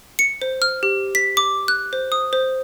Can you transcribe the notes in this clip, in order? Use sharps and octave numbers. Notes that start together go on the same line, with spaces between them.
C#7
C5
F6
G4
B6
D6
F#6
C5
D#6
C5